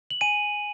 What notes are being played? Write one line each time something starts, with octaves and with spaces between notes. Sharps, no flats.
F#7
G#5 D#7